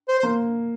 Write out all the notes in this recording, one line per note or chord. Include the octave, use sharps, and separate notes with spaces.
C5
C5
A#3